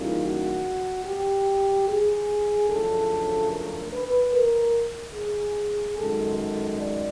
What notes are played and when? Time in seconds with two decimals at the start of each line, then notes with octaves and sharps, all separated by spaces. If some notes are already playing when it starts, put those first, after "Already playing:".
Already playing: C#3 E3 G3 A#3 D#4 F4
0.23 F#4
1.05 G4
1.88 G#4
2.69 F#2 C#3 F3 A3 D4 A4
3.52 A#4
3.92 B4
4.34 A#4
5.15 G#4
5.97 F#2 D#3 G#3 A4
6.38 A4
6.79 D5